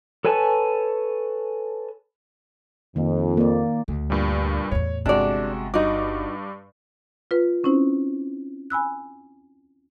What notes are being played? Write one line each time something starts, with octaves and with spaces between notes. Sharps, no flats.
A4 B4 C#5 G#5 A5
F2 D#3 A#3
A#3 D5
D2
G2 A#2 G3
E2 A2 C#5
G1 C3 G#3 D4 F#4 D5
G2 D#4 F#4 D6
F4 B4
C4 C#4 D#4 E4 C5
G#5 B5 E6 F#6